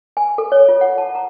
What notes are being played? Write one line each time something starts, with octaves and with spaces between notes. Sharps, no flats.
G#5
A4
C#5
F4
F#5
A5
A#5